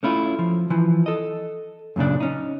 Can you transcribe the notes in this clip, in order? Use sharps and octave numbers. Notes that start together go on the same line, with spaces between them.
A3 C#4 E4 F4
F3
E3 F3
A4 D#5
F#2 A#2 C#3 D4
C#4 D#4